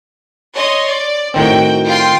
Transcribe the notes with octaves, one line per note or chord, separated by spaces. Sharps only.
C#5 D#5 C6
D5
A2 D#3 C4 F#4 G5
F4 G5 C6